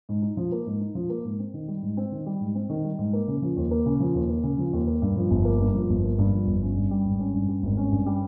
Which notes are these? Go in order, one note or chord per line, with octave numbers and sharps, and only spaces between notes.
G#2
D#4
F3
A#3
G#2
D#4
F3
A#3
G#2
C4
D#3
G3
G#2
C4
D#3
G3
G#2
C4
D#3
G3
G#2
A#3
C#3
F3
D#2
A#3
C#3
F3
D#2
A#3
C#3
F3
D#2
A#3
G2
F3
G1
A#3
G2
F3
G1
A#3
G2
F3
G1
C#4
G2
G3
G#1
C#4
G2
G3
G#1
C#4
G2
G3